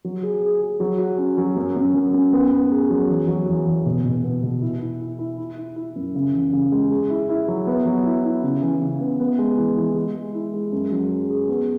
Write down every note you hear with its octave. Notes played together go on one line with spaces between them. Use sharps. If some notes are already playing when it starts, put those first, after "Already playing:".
F#3
G#4
G#4
G#4
F#3
F#4
C#4
F#3
F#2
F#2
F#2
F#2
B3
B3
G#4
F#3
E2
F#3
E2
E2
B2
B2
B3
B2
E4
E4
E4
E4
E4
E4
E4
F#2
C#3
E2
C#3
G#3
G#4
E4
E4
F#3
B3
F#3
E4
E4
C#3
E3
C#3
B3
B3
G#3
E3
E3
G#3
G#3
E4
G#3
F#2
F#3
G#4
G#4
B3